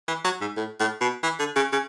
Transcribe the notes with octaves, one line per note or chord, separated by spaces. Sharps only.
E3
F#3
G#2
A2
A2
B2
E3
D3
C#3
C#3